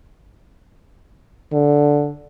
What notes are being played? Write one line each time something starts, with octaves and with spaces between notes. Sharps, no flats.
D3